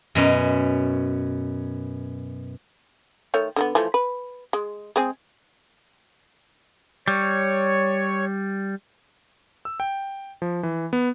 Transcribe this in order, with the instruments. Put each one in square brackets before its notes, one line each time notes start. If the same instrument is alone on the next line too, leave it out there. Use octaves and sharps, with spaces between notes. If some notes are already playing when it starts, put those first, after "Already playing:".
[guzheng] F#2 B2 C#4
[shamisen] D#3 A3 C#5
D3 G3 B3
E3 F3 A3
B4
G#3
G#3 C4 G#4
[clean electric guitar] G3 [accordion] C#5
[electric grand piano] E6
G5
F3
E3
B3